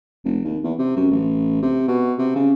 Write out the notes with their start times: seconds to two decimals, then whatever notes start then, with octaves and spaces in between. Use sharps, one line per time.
0.25 F1
0.44 D#2
0.64 E2
0.79 C3
0.96 F#2
1.11 A1
1.62 C3
1.88 B2
2.18 C3
2.36 C#3